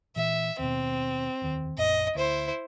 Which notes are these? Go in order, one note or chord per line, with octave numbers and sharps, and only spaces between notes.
A#2 E3 E5
D#2 B2 C4
F1 D#2 D#3
A#1 F#2 A#2 D#5
D2 E4 C5